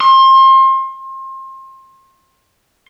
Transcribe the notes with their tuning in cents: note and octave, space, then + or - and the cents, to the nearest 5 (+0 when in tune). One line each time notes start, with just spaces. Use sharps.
C6 +30